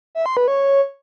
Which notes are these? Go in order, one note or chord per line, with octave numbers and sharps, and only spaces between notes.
E5
C6
B4
C#5